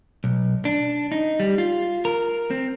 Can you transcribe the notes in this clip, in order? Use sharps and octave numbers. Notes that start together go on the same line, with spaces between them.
B1
D4
D#4
G3
F4
A#4
C4